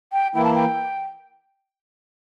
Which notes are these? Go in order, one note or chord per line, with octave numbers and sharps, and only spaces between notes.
G5
E3 A#3 E4 G5
A5
G5